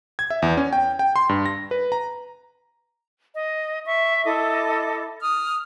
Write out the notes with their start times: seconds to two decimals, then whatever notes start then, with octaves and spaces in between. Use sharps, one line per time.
0.19 G#6
0.30 E5
0.42 E2
0.57 C#4
0.73 G5
0.99 G5
1.16 C6
1.29 G2
1.46 A#6
1.71 B4
1.92 A#5
3.34 D#5
3.85 E5 C#6
4.25 E4 A4 D#5 D6
5.22 D#6 F6